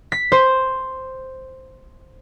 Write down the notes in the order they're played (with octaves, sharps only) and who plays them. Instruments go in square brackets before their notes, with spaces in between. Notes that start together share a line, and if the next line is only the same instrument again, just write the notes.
[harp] B6
C5